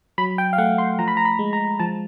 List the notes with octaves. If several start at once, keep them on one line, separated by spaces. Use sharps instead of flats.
F#3 B5
G5
F5
A3 F#5
C6
F3 A#5
B5
A#5
B5
G#3
A#5
F3 A5